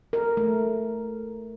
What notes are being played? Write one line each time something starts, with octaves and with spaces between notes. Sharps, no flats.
A#4
A3